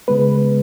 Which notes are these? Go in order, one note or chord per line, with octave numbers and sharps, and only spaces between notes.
C#3 G#3 B3 B4